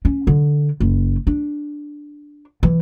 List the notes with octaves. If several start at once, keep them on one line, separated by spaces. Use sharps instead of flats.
C#4
D3
F#1
D4
E3